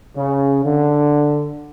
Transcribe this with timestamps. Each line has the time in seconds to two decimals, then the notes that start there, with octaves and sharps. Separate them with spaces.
0.16 C#3
0.65 D3